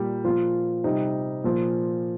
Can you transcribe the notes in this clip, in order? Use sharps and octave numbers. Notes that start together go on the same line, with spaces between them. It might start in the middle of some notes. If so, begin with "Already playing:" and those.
Already playing: A#2 G3 G4
A#2 F3 F4
C3 G3 D#4
A#2 F3